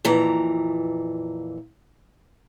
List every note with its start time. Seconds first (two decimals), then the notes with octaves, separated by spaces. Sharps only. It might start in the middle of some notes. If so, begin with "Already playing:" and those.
0.05 F2 A#2 E3 A#5